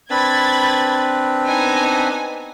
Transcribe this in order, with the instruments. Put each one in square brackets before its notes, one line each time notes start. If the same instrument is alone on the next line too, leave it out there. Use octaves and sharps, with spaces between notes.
[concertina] C4 D4 B4 [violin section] B5 G#6 A6
[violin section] B3 D#4 G#5